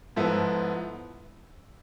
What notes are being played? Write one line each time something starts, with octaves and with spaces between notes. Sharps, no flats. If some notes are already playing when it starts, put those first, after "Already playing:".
G#2 F3 B3 E4 A4